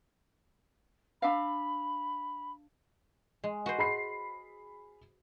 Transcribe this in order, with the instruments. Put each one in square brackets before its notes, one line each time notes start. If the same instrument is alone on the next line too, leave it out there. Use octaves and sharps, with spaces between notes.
[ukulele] D4 E5 F5 [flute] B5
[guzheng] G#3
F#4 B4 C5
[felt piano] G#4 B5 C7